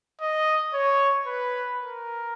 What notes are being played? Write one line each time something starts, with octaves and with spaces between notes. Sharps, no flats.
D#5
C#5
B4
A#4